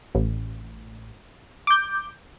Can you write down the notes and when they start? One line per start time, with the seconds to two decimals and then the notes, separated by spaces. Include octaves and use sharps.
0.15 A1
1.67 D6 G6